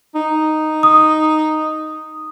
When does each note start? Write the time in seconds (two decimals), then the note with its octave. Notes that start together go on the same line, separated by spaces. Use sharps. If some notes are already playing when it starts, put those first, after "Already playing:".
0.15 D#4
0.83 D#6